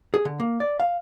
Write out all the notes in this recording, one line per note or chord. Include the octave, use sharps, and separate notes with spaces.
G#4
D3
A#3
D5
F5